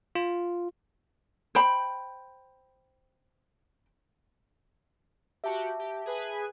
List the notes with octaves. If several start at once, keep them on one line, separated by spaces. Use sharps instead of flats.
F4
C5 G5 B5
F#4 G4 E5 A5
G4
G#4 B4 G#5